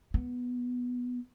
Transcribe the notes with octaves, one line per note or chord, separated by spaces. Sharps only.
B3